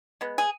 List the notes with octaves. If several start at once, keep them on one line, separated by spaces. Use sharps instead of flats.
G#3 B3
G#4